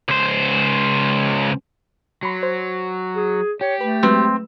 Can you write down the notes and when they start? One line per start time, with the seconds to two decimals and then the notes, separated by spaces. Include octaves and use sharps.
0.09 C#2 C5
2.23 F#3 B5 C6 C#7
2.43 C5
3.16 G#4
3.61 G4 C#5
3.81 A3 B4
4.03 F#3 G#3 C4 B4